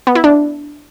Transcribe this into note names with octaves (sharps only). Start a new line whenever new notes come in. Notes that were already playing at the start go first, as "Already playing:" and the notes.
B3
E4
D4